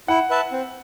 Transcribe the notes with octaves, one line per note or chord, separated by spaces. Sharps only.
E4 F#5
B4 E5 A5
C4